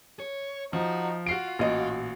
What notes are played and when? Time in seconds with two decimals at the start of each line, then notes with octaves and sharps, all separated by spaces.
0.20 C#5
0.73 F3 D#4 F#4
1.26 F4 F#4 F5 C7 D7
1.59 A1 A#2 F#4 D#5